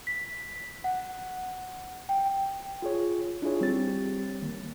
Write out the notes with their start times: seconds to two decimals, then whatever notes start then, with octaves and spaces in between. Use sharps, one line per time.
0.07 B6
0.84 F#5
2.09 G5
2.82 F4 G#4 C#5
3.42 D4 E4 F4 G#4 C#5
3.61 G3 C4 G4 C#5 A6
4.42 D#3 A#3